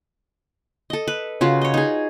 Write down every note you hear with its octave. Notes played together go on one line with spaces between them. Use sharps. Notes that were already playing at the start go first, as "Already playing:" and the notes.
A4 D#5
B4
C#3 F4 F#4
C#5 D#5
D#4 G#4